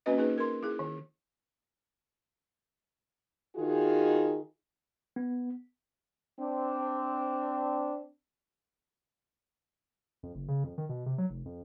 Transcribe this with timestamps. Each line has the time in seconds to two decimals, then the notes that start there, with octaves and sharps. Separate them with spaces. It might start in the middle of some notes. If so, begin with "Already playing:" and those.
0.06 A#3 C4 C#4 F#4 B4 D#5
0.18 A#3 D#4 G#4 B4
0.38 A#4 C6
0.63 E4 G#4
0.79 D#3
3.56 D#3 D#4 F4 F#4 G#4
5.16 B3
6.39 C4 D4
10.23 F2
10.35 F#1
10.48 C#3
10.64 F2
10.78 D#3
10.89 B2
11.06 C3
11.18 F#3
11.30 F1
11.45 F2